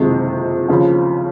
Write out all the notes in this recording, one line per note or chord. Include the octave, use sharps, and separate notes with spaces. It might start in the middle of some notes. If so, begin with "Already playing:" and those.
Already playing: F#1 F2 C3 D#3 G#3
D#2 C#3 F3